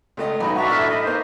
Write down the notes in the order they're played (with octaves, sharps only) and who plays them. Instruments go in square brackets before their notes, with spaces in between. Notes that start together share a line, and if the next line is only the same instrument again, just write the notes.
[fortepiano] C#2 A3 D#5
[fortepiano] B1 G#2 [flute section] D#5 B5
[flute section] D4 E5 C#6 [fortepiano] F#4 A#5
[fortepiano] A2 A3 F6
[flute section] D#5 B5
[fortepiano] A#3 D#4 [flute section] C5